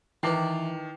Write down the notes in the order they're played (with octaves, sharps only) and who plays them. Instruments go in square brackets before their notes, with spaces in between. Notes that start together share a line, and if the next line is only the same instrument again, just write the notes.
[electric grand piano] D#3 A5 C7 [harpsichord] E3 [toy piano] E4 D6 [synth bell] B4 G5